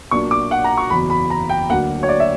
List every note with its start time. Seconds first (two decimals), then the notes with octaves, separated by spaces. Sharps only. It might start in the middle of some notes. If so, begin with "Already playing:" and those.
0.11 B1 A#2 A#3 D4 C#6
0.31 D6
0.51 F#5
0.64 A#5
0.78 C#6
0.90 F#1 E2 B2 B5
1.10 B5
1.30 A#5
1.49 G5
1.70 D2 D3 F#3 A#3 F#5
2.03 C#5
2.09 D5
2.20 E5